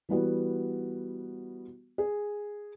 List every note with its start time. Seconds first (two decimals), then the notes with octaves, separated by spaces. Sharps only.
0.09 E3 G3 B3 F#4
1.98 G#4